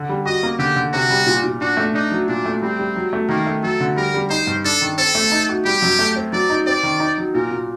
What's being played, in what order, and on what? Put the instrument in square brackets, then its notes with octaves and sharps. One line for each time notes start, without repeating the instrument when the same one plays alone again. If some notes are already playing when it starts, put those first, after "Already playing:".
Already playing: [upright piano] D3
G3
[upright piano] F#4 [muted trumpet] D#5
[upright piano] A#3
[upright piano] D3 [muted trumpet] G4
[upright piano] D3
[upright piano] C3 [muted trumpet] F#4
[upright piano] G3
A#2
A#2
[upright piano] D4 [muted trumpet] F#4
[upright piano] A3
[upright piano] D4 [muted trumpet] D#4
[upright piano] F#3
[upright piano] A#2 [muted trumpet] D4
[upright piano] A3
[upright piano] G3 [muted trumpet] C4
[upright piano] G3
F#3
A3
[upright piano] D#3 [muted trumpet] A#3
[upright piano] A3
[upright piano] F#3 [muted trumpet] A4
[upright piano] D3
[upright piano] G3 [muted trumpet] A#4
[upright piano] G3
[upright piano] D#4 [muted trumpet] C5
[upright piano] G2
[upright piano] D4 [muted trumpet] A4
[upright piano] D#3
[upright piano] C4 [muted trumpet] A4
[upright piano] A3
D#4
F#4
[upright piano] G3 [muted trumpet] G4
[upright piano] F#2
A3
C4
[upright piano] F#3 [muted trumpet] D5
[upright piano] D#4
[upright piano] C4 [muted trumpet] D5
[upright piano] D#3
D#4
F#3
[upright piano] A#2 [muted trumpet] A#4
[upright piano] A#2